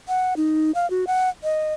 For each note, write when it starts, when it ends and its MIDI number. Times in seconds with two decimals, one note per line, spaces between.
0.08 0.34 78
0.37 0.71 63
0.75 0.89 77
0.90 1.05 66
1.07 1.29 78
1.44 1.74 75